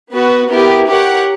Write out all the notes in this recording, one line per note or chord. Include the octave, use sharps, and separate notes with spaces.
B3 F#4 B4
B3 E4 G4 A#4
G4 A#4 C#5 F#5